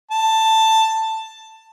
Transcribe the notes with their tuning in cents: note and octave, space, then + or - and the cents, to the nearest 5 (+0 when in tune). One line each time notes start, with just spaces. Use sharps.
A5 +10